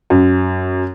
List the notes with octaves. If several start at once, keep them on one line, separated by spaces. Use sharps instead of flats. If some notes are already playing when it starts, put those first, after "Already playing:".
F#2